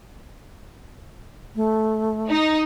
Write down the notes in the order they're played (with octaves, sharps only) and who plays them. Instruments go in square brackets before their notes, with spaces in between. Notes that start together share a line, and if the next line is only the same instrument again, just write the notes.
[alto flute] A3
[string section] D#4